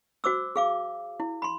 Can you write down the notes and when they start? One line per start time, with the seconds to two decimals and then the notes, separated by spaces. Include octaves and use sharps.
0.24 F#4 C5 D6 E6
0.56 G#4 F5 D6
1.20 E4
1.42 B5 C6